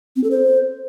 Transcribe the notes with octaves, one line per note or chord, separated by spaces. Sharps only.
C4
A4
C5